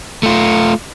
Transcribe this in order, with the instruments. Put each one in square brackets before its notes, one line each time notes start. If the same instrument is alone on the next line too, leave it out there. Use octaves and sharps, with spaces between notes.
[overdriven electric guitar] A3 F4